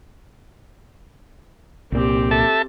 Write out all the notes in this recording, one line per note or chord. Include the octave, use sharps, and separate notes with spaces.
C2 A#2 C4 G4
A4 E5 A5